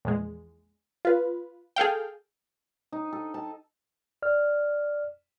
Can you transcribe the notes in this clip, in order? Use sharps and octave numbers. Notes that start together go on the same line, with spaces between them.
A#1 E2 G#3
F4 B4
G#4 A4 F5 G5
D#4
A4
A5
D5 F6